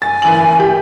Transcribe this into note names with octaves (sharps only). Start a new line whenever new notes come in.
G#5 A6
F#1 E3 F#7
G4